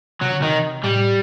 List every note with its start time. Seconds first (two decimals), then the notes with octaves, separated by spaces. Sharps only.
0.22 C3 F#3
0.31 D3
0.40 C3 D#3
0.83 A2 G3